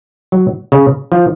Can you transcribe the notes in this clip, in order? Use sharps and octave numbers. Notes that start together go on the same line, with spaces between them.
F#3
C#3
F3